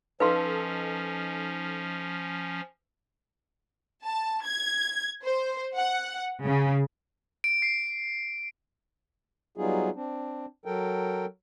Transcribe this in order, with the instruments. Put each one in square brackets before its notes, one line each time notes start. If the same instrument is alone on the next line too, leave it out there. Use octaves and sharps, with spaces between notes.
[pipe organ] F3 C#4 [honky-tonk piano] D#4 A4 [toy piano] B4 F5 C6
[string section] A5
G#6
C5
F#5
C#3
[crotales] D7
C7
[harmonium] F#3 G3 B3 D#4 F4 G#4
C4 D4
F#3 A4 A#4 G5